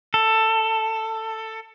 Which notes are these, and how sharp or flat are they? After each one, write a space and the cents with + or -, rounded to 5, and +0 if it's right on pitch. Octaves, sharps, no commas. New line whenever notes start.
A4 +15